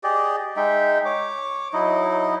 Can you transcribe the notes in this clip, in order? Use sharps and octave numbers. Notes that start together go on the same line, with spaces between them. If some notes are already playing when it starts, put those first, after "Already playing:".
G4 G#4 D5 D#5
G#3 D#4 E5 G5
C#5 D6
F#3 D#4 E4 D#5